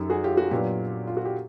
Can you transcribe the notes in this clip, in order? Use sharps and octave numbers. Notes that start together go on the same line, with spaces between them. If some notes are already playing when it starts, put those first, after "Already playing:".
Already playing: F#2 D#3 F#3 G4 A4
F#4 G#4
F4 G4
F#4
A#2 F#3 B3 D4 F4 G4
F4
F#4
G4